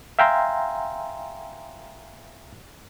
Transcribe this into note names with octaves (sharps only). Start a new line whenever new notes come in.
E5 F5 G5 G#5 A#5 C6